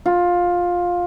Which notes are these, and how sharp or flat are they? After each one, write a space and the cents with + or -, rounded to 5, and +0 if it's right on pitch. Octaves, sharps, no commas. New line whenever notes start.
F4 +15